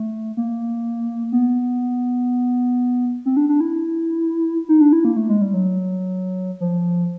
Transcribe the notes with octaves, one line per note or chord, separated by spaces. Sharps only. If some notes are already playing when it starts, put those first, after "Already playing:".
Already playing: A3
A#3
B3
C4
D4
D4
E4
D#4
D4
E4
A#3
A3
G#3
G3
F#3
F3